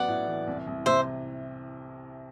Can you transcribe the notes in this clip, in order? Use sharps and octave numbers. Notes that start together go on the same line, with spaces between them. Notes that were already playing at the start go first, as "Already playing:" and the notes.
Already playing: A1 F#3 B3 D5 F#5
A2
E3
C2
C2
C3 C5 E5